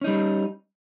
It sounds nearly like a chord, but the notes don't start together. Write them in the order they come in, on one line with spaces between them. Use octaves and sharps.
C#4 D#4 G3